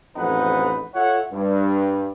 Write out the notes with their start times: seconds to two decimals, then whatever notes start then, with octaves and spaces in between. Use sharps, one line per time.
0.16 A1 F2 G#2 D#4 B4 F#5
0.94 F4 A4 C#5 E5 F#5
1.31 G2